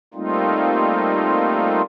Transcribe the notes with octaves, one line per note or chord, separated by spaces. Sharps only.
G3 A3 A#3 C4 D#4 F4